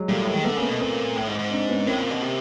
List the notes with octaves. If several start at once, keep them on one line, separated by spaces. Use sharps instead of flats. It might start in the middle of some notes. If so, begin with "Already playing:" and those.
Already playing: F#3 G#3
A#2 G3 A3
A2
G#3 A#3
D#3
D3 A3 B3
C#3 A#3
A3 B3
B2
A#2 A#3 C4
A2
G#2
G#2
C4 D4
B3 C#4
A2 A#3 C4
A#2
B2
C3